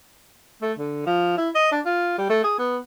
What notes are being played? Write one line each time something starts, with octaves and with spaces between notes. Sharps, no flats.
A3
D3
F3
E4
D#5
D4
F4
G3
A3
G#4
B3